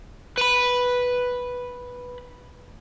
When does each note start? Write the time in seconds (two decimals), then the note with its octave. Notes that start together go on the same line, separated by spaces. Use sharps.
0.38 B4 B5